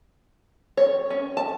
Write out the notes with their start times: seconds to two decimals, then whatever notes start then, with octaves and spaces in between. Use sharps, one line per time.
0.77 C#5
1.10 C#4
1.37 A5